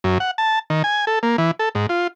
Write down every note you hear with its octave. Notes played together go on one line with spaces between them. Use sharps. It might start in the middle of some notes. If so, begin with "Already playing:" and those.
F#2
F#5
A5
D#3
G#5
A4
A#3
E3
A4
G#2
F4